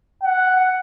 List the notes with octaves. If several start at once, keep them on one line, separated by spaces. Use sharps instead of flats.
F#5